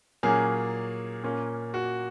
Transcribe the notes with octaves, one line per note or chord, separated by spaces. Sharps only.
A#2 F#3 A#3 C#4 G#4
A#2 A#3 C#4
F#4